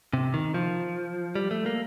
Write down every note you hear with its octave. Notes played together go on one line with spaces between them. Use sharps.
C3
D#3
F3
G3
A3
A#3